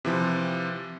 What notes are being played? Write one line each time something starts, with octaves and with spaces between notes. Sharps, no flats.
C3 E3 F3